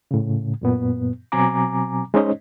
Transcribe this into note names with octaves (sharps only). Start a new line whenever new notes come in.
A2 C#3
F#2 A#2 B3
B2 F#3 C4 G#5 A#5 D6
G#3 C#4 D#4 C5 C#5 D#5